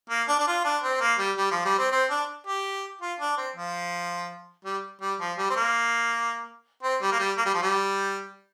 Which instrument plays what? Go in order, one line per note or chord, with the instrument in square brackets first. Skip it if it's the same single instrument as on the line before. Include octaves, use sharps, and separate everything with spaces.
[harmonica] A#3
D4
D4
F4
D4
C4
A#3
G3
G3
F3
G3
C4
C4
D4
G4
F4
D4
C4
F3
G3
G3
F3
G3
C4
A#3
C4
G3
A#3
G3
A#3
G3
F3
G3